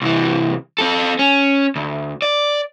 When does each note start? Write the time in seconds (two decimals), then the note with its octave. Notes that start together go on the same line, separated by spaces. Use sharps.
0.01 C2 E3
0.78 C4 A4
1.19 C#4
1.76 D2
2.22 D5